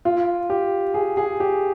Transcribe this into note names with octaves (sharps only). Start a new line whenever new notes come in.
F4
G4
G#4
G#4
G4